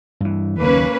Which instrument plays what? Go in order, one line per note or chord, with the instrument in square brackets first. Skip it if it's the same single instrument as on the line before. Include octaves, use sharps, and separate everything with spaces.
[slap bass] G2 E3
[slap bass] F#1 D#2 [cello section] A#3 C#4 B4